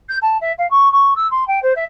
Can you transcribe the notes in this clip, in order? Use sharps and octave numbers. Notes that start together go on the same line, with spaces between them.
G6
A5
E5
F5
C#6
C#6
E6
C6
G5
C5
E5